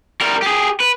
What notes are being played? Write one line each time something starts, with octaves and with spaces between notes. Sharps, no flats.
G3 A#4
G4 G#4
B4